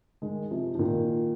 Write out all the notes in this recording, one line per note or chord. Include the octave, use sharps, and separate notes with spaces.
D#3 G#3
C3 F3
F3
A#2 D#3